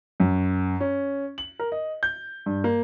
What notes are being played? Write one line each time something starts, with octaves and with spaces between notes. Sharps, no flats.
F#2
C#4
F#7
A#4
D#5
G6
G2
A#3